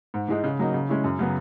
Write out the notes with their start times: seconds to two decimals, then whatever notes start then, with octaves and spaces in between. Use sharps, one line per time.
0.14 G#2
0.28 E3 G#3 D#4
0.44 C#3
0.59 F#3 A#3 D#4
0.74 C#3
0.89 G#3 C#4 E4
1.04 F#2
1.19 C#3 F#3 B3